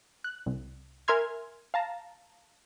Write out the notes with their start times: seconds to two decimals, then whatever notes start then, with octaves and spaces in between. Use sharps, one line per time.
0.24 F#6
0.46 C2
1.08 A#4 E5 G#5 C6 F6 G#6
1.74 F5 A5 A#5